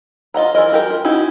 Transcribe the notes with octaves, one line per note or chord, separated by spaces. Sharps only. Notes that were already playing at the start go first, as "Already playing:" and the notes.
F4 D#5 F#5 A#5
E3 F4 A#4 D#5
F#4 G4 A#4
F4
C#4 D#4 E4 F#4 G4